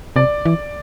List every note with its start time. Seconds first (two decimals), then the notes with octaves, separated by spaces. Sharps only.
0.16 C3 D5
0.46 E3